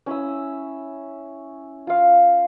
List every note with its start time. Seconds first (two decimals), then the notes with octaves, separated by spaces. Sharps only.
0.06 C#4 E4 D#6 E6
1.87 F4 F5